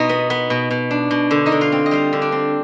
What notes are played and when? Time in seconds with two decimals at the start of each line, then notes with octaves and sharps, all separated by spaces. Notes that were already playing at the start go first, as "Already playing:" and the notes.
Already playing: B2 D#4 F4 D#5
0.09 B3
0.30 B3
0.50 B2
0.71 B2
0.91 D4
1.11 B2
1.31 D3
1.46 D#4 D#5
1.52 D3
1.61 F4 F5
1.72 C4
1.86 D#5
1.91 G3 F4 F5
2.13 D3
2.22 D4 D5
2.32 C4